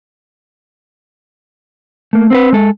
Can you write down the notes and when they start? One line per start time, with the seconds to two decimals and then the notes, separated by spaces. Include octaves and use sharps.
2.13 A3 A#3
2.30 C4 A#4 B4
2.53 G#3 A4